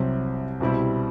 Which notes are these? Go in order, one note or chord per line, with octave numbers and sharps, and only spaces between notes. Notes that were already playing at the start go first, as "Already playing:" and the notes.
Already playing: C2 C3 F#3 C4
C2 B2 G3 C4 E4